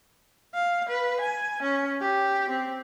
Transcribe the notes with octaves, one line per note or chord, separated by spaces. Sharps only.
F5
B4
G#5
C#4
G4
C4